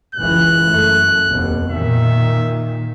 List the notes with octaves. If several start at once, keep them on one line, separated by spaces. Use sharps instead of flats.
F#1 C#2 E3 F#6
F#2 A3
F1 D#2 B2
A#2 D#3 E5